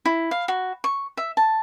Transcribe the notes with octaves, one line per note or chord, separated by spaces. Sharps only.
E4
F5
F#4
C#6
E5
A5